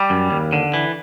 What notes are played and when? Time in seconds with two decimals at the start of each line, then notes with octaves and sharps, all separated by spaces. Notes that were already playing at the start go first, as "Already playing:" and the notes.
Already playing: G3
0.10 F#2
0.31 D#2
0.53 D3
0.74 E3